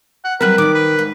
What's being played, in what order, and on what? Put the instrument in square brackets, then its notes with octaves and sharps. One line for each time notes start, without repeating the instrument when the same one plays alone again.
[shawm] F#5
[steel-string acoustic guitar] F#3 G3 C4 [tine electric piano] A#4 F#6 [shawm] B4
[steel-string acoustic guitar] D#3 D5 [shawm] D6
[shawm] B4
[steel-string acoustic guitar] G#2